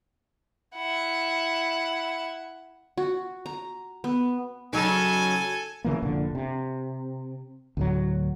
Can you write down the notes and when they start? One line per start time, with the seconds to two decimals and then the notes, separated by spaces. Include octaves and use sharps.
0.76 E4 F#5
2.97 F#4
3.46 A#5
4.04 B3
4.73 C#3 F#3 D#4 A4 G#5
5.84 C#3 E3 A#3
6.02 F1 A#1 A#2 D3
6.35 C3
7.77 D2 A2 F#3